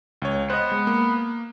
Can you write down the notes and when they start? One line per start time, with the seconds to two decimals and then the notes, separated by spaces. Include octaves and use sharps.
0.22 C#2 C#5
0.50 B3 C5 D#5
0.72 G#3
0.87 A#3